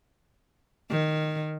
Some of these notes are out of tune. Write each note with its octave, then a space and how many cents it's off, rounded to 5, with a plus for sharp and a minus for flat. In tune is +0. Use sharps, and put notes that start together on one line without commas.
D#3 -10